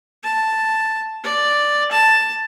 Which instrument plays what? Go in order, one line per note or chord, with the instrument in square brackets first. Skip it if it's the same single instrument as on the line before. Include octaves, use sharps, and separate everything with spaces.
[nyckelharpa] A5
D5
A5